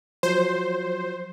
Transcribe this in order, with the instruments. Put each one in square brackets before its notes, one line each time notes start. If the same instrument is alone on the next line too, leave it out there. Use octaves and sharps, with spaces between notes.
[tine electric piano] F3 F#3 [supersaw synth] C5